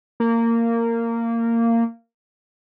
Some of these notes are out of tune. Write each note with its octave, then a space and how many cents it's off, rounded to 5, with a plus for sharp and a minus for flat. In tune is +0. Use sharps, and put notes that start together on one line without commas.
A#3 -15